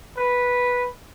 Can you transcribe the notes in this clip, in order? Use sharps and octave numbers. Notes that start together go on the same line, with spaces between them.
B4